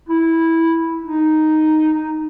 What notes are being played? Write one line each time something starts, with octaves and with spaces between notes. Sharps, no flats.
E4
D#4